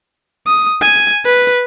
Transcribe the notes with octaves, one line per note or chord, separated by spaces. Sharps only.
D#6
G#5
B4